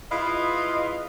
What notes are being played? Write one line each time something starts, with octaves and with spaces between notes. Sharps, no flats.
E4 F4 G#4 B4 D#5 F5